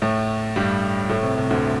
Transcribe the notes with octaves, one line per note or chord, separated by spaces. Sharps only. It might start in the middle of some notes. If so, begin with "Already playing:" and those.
A2 A3
G2 G3
A2 A3
C3
C3
D2 D3